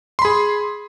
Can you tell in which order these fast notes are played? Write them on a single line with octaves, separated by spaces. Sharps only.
C6 B5 G#4